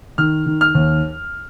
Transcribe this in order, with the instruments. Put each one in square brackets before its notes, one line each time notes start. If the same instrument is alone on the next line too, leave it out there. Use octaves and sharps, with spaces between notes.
[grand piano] D#3 F6
D#3
F6
D#2